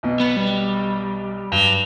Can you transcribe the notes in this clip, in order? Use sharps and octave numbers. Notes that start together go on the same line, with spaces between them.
B1 B2
B3
G3
G2 F#3